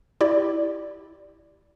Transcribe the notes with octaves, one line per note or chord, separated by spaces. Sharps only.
E4 G4 D5